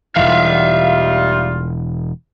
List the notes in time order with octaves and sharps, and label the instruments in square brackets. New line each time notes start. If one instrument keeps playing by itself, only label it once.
[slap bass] E1 C#2 E3 [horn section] G3 D#4 F4 [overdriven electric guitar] E5 F5